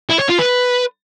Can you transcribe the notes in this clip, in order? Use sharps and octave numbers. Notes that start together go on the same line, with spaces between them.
E4
C#5
F4
B4